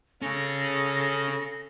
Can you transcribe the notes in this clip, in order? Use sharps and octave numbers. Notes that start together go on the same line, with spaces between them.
C#3 C#4 G#4 A4 A#6